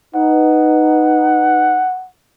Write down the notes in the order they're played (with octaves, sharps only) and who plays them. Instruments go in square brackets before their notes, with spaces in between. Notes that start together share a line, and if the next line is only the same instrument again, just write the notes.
[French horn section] D#4 B4 [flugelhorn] F#5